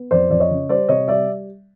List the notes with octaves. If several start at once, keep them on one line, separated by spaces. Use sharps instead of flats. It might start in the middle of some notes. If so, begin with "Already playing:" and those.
Already playing: B3
F2 C5 D5
F2 D5
C#5 D#5
C#3
G3 C5 D5
C3 C#5 D#5
G3 D5 E5